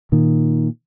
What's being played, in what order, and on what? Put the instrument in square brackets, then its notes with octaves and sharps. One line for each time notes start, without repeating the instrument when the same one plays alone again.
[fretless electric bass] A#2 D#3